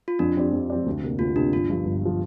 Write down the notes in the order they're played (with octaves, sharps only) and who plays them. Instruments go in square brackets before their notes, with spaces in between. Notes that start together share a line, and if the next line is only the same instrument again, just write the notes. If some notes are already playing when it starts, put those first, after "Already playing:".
[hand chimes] F4
[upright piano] F2 [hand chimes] D4
[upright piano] F3 C4 G4 D5
F2
F3 C4 G4 D5
D2
C3 A#3
[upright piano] D2 [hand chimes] F4
[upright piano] C3 A#3 [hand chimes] D4
[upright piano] G1 [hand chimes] F4
[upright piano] G2 F3
G1
F3